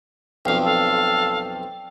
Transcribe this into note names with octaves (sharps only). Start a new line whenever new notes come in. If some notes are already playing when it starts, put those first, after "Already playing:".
B1 F2 D5 F5 G5
A4 F5